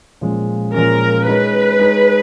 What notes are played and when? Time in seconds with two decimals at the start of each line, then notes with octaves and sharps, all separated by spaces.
0.21 A#2 F3 G#3 C#4
0.74 A#2 F3 G#3 C#4 A#4
1.27 G#3 D#4 G#4 B4 C#5
1.79 G#3 D#4 G#4 C#5